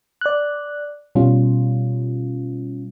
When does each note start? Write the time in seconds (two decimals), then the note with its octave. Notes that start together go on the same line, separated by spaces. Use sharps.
0.21 D5 F#6
1.15 B2 G3 C#4 F4